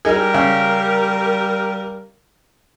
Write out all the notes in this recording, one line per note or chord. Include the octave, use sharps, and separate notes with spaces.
G3 D#4 G#4 A#4
C#3